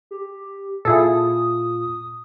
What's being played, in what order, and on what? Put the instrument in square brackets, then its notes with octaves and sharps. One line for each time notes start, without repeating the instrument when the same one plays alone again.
[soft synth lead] G4
[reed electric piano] A#2 F4 [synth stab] E4 G#4 A4 [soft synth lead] D#6